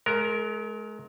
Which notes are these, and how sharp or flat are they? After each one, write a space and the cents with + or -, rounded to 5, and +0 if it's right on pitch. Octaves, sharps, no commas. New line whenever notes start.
G#3 +40 A#4 +0